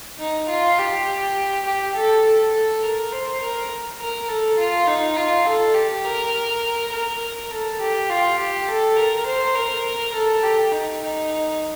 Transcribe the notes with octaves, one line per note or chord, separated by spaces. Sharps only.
D#4
F4
G4
G4
A4
A4
A4
A#4
C5
A#4
A#4
A4
F4
D#4
F4
A4
G4
A#4
A#4
A4
G4
F4
G4
A4
A#4
C5
A#4
A4
G4
D#4
D#4